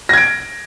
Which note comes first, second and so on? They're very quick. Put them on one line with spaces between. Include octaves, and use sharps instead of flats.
A#6 G#6 D7